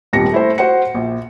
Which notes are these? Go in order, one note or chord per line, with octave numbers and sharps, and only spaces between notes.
D#1 G#1 G3 A#6 C#7
A3 E4 C5
F#4 C5 F#5 C#7
A#1